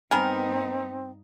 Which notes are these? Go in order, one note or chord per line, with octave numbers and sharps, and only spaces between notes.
G2 D#3 B3 C4 D#4 A#4 G#5 B5